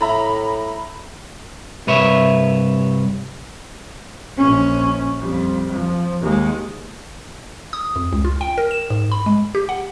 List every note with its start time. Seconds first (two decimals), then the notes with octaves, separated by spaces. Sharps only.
0.01 A2 E5 A#5 B5
1.87 C2 G2 B4 C#5 E5
4.37 A#1 C#4
5.21 F2 G3
5.72 F3
6.22 D#2 G#3
7.73 D#6
7.96 F2
8.13 C#2
8.25 F4
8.41 G5
8.58 A#4
8.71 E7
8.90 G#2
9.12 B5
9.26 G#3
9.55 G4
9.69 F#5